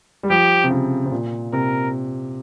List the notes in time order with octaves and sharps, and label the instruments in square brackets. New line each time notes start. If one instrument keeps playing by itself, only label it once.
[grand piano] G3
[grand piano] F3 [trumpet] G4
[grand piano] C3
C#3
C3
A#2
[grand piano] C3 [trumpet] A#4